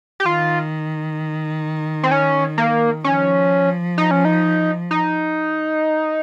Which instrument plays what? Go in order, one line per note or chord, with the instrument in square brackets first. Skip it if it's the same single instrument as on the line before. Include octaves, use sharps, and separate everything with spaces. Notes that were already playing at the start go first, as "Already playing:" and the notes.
[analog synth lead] G4
[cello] D#3 [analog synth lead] F4
[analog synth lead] C4
C#4
A#3
[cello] F3 [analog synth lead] C#4
[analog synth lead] D#4
C#4
D#4
D#4